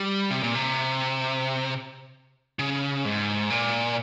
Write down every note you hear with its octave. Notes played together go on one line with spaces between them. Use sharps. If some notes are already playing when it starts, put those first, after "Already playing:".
Already playing: G3
C3
A#2
C3
C#3
G#2
A#2